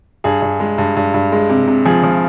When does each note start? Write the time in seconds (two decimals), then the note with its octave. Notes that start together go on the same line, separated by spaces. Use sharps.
0.24 G2 G#4
0.42 G2
0.60 G#3
0.78 G2
0.96 G2
1.14 G2
1.32 G#3
1.49 C3
1.67 C3
1.85 F3 G#4
2.03 F3